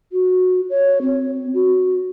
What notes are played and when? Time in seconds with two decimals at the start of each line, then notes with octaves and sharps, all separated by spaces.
0.12 F#4
0.70 C#5
1.02 C4
1.54 F#4